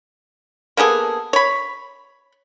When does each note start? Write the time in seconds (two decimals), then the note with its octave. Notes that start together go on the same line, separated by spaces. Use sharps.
0.77 A#3 B3 G#4 A4
1.33 C#5 B5